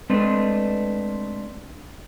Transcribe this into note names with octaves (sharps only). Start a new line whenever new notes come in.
G#3 A3 C4 D4 B4